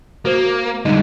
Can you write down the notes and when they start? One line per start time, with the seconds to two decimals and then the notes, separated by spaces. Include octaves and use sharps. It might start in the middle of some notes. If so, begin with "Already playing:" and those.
0.25 A#3 F#4 C5
0.85 D3 G3 G#3 D#4